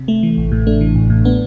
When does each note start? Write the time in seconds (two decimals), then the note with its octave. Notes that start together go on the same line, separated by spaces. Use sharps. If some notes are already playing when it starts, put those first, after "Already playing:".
Already playing: C3
0.08 A3
0.23 E3
0.38 A1
0.52 A2
0.67 A3 D4
0.81 E3
0.95 A1
1.10 A2
1.25 B3 D4